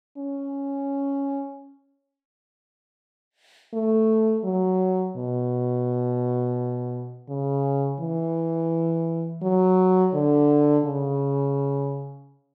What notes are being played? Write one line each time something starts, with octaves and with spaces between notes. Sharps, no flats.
C#4
A3
F#3
B2
C#3
E3
F#3
D3
C#3